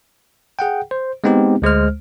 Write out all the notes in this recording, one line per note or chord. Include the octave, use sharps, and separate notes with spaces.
G#4 F#5 G5
C5
G#3 B3 C4 D#4 G4
D2 G#3 C5 F6